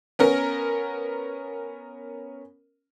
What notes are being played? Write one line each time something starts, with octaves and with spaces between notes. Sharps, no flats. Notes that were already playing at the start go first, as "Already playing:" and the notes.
B3 C#4 A#4